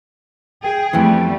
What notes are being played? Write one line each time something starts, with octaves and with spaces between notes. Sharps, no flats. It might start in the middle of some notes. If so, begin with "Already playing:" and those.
G#4 G5
F2 E3 G3 A3 B3 G5